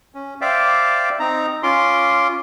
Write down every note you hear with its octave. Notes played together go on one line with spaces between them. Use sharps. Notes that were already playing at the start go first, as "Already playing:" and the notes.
C#4
C5 D5 E5 F5 G5 D6
C4 D#4 A#5
C#4 F4 C6 D6